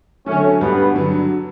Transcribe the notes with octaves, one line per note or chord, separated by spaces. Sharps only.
D3 F#3 A3 C#4
G2 G3 B3
D3 F#3